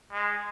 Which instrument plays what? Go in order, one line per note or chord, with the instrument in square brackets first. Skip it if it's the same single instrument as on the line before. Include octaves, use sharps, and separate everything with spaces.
[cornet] G#3